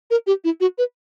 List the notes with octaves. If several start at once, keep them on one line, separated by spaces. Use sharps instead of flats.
A#4
G4
E4
F#4
B4